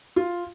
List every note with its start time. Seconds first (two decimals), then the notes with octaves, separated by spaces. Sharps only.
0.16 F4